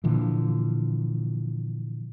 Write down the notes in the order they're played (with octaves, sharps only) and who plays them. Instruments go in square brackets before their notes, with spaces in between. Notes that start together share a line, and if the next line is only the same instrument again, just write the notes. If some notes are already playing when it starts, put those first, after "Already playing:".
[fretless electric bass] A#2 D3 E3 F3